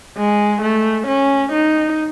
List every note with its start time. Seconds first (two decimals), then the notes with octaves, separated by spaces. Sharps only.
0.17 G#3
0.62 A3
1.07 C#4
1.52 D#4